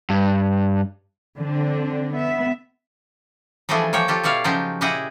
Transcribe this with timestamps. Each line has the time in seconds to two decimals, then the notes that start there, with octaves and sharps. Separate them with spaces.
0.10 G2
1.38 D3 C4 D4
2.14 B3 E5
3.69 E3 F3 G3 A3 D4 G#4
3.93 F3 A#3 C#5 G5
4.08 F4 G4 A4
4.23 B2 E4 C#5 D5 F5
4.44 C#3 F3 F#3 D#4 F4 G4
4.81 A#2 E4 G4 G#4 D#5 F#5